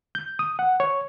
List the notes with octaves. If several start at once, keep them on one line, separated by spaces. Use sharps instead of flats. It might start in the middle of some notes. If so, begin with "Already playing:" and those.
G6
D#6
F#5
C#5